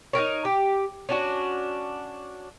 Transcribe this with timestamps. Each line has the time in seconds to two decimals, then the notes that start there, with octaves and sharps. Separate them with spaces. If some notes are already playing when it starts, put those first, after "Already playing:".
0.13 D#4 F4 A#4 C#5
0.45 G4
1.09 C#4 D4 F#4